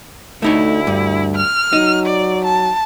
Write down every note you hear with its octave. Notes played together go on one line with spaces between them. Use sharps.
D2 A3 D#4 E4 C#5
G2
F6
F#3 D#4
D5
A5